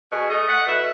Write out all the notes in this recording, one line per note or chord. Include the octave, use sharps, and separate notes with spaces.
B2 G#4
A3 D#5
A3 F#5
B2 E5